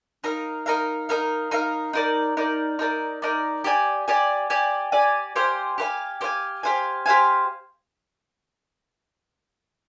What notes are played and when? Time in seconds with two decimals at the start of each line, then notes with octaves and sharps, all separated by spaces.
0.24 D#4 A#4 F5
0.66 D#4 A#4 F5
1.09 D#4 A#4 F5
1.51 D#4 A#4 F5
1.93 D#4 A#4 D5
2.37 D#4 A#4 D5
2.79 D#4 A#4 D5
3.22 D#4 A#4 D5
3.64 G4 D5 G#5
4.08 G4 D5 G#5
4.50 G4 D5 G#5
4.92 G4 D5 G#5
5.36 G4 C5 F5 G#5
5.78 G4 C5 F5 G#5
6.21 G4 C5
6.24 F5 G#5
6.63 G4 C5 F5 G#5
7.06 G4 C5 F5 G#5